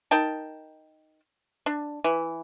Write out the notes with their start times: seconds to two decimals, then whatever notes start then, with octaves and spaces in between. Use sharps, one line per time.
0.11 D#4 A#4 G5 A5
1.66 D4
2.04 E3